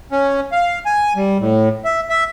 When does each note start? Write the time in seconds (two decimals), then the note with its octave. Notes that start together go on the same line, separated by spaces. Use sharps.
0.12 C#4
0.52 F5
0.86 G#5
1.16 G3
1.40 A2
1.85 E5
2.09 E5